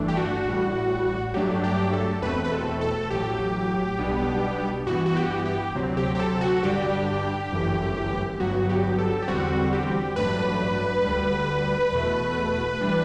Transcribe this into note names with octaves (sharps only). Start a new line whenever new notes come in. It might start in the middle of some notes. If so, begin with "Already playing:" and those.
Already playing: G1 G2 E3 A3 D4
G4
F#4
A1 A2 G3
G2 F#3 A3 D4 G4
G4
A4
E2 B2 A3 C4 B4
B4
A4
A4
A1 A2 F#3 G4
B1 B2 G3 B3 D4
G2 E3 B3 F#4
F#4
G4
G4
D2 C3 F#3 C4
G4
G4
A4
F#4
G2 D3 G3 D4 G4
G1 F#2 E3 A3
G1 G2 F#3 B3 F#4
G4
A4
G4
E2 D3 G3 C4 F#4
G4
A1 G2 F#3 A3 D4 B4
D2 D3 G3
E2 B2 A3
E3 G3 D4